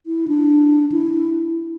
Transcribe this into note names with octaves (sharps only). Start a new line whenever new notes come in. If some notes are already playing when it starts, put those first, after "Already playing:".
E4
D4
E4